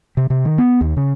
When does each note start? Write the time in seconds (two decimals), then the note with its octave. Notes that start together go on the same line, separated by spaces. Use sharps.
0.17 C3
0.30 C3
0.45 D#3
0.58 B3
0.81 D#2
0.97 C#3